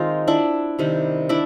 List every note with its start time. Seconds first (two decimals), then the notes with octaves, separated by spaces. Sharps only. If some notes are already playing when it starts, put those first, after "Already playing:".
Already playing: D#3 G#3 C4 D#4 F4
0.28 D4 E4
0.79 C3 D#3 G3
1.29 D4 E4